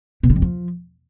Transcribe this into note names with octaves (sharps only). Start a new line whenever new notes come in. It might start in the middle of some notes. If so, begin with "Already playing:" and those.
B2
D3
F2
F3